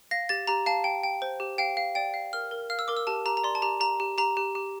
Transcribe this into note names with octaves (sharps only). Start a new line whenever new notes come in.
F5 A#6
G4 A6
G4 A#5
F5 A5
G5
G5
C5
G4
F5 G5
F5
D5 G5
F5
A#4 F6
A#4
F5 F6
E6
A#4 D6
E6
G4 A5
G4 A#5
A#5
D5 C6
A5
G4 A#5
G4 A#5
G4
G4 A#5
G4
G4